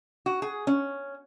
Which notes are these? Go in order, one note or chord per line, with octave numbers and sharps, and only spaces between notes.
F#4
G#4
C#4